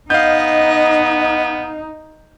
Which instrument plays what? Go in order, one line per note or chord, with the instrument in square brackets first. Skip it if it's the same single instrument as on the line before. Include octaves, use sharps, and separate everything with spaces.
[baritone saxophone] B3 [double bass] D#4 [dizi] D#5 [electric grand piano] F5 G6